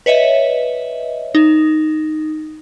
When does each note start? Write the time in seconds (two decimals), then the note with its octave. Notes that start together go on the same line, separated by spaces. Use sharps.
0.06 B4 C#5 D#5 E5
1.35 D#4